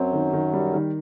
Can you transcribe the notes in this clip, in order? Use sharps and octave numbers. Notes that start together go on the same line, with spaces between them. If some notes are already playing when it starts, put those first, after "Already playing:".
Already playing: F#2 F#3 C4
D#3
D#3
G3
D#3